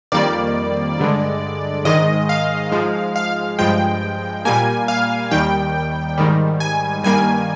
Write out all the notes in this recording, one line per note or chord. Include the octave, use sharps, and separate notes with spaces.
F2 D#3 G3 A#3 D5
G2 D3 G#3
G#2 D#3 G#3 D#5
F5
G#2 F3 G#3
F5
G2 F3 G#3 G5
A#2 G3 A#3 G#5
F5
D#2 D#3 G3 G5
G#2 D#3 G3
G#5
G2 D#3 G3 A#3 G#5